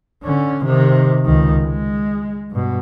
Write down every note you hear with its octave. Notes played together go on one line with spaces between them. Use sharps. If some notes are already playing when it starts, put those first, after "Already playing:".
D3 C#4
C3 D#3
C#2 D#3
G#3
G2 B2